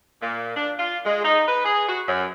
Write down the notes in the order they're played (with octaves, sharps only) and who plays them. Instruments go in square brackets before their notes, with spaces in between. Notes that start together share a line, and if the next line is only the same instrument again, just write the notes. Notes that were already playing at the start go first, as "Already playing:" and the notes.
[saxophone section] A#2
D4
F4
G#3
D#4
B4
G#4
F#4
F#2